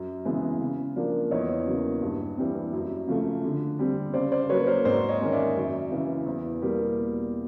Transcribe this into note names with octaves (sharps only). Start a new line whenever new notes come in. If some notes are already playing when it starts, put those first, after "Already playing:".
Already playing: F#2
C#3 E3 G#3 B3
C#3
F3 A#3 D4
E2 C#5 D#5
C#3 F#3 A#3
G2
E3 G3 C4
F#2
C#3 F3 A3
D3
G3 C4
C#3 C5 D5
C5 D5
F#3 A#3 B4 C#5
A#4 C5
G#2 C5 D5
C#5 D#5
D#3 G#3 C#4
D5 E5
F#2
C#3 E3
E2
B2 G3 A#3